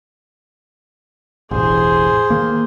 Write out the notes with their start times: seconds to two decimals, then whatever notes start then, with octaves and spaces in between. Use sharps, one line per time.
1.51 E1 A1 G#4 C5
2.30 D#3 A#3